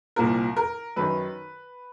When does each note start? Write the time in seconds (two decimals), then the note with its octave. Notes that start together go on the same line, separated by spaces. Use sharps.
0.16 C2 A#2 F3 A#4
0.56 A#4
0.96 F#2 D#3 B4